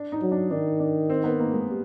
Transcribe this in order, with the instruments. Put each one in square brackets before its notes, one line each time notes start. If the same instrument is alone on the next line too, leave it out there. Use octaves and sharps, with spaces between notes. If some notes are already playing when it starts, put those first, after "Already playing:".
Already playing: [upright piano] D4
D#4
[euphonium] F#3
[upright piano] D4
[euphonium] D#3 [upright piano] D4
[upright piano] D4
C4
B3
A#3
G#3
G3